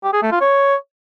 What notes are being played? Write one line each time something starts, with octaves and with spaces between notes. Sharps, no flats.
G4
G#4
A3
F4
C#5